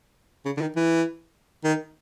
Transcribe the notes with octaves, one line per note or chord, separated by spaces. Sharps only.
C#3
D3
D#3
E3
D#3